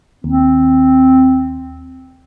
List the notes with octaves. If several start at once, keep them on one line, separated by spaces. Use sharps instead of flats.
D#2 C4